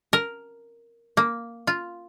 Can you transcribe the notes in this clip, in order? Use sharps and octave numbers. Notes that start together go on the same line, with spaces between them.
A#4
A#3
F4